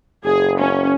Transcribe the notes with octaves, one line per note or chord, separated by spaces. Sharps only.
F#1 G#4
C#4